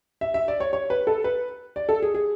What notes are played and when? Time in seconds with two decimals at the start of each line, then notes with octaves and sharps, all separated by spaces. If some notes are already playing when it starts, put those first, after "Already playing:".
0.21 E5
0.34 E5
0.48 D5
0.60 C#5
0.73 C#5
0.90 B4
1.07 A4
1.24 B4
1.76 D5
1.89 A4
2.02 G#4
2.14 G#4